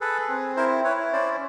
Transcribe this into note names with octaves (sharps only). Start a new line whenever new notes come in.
G#4 A4 B4
C4
E4 A#4 C5
E4 B4 C#5
C#4 C5 D5